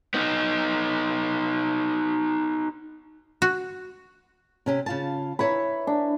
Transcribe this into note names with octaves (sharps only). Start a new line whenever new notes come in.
B3 D#4
F#4
C3 C#4 G4
C#3 F4 A5
E4 B4 C#5 E5 B5
D4